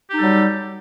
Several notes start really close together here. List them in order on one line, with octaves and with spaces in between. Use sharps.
G4 D#4 A4 G3 F#3